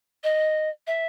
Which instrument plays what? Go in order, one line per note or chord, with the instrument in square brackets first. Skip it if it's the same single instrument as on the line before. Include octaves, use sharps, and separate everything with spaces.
[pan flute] D#5
E5